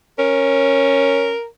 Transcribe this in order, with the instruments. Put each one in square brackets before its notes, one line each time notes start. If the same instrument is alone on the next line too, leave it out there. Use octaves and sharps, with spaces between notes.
[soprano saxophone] C#4 [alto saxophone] A#4